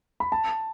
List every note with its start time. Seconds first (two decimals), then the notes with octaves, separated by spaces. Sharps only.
0.20 B5
0.32 A5